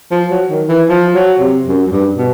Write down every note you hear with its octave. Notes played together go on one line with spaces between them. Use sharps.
F3
F#3
D#3
E3
F3
F#3
C3
F#2
F#2
G2
B2